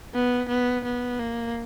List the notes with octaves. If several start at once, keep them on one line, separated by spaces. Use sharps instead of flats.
B3
B3
B3
A#3